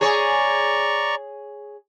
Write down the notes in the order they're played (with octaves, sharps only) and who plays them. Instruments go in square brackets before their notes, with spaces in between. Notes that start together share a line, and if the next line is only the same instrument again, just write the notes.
[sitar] G#4 C#5 [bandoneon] D5 A#5 C#6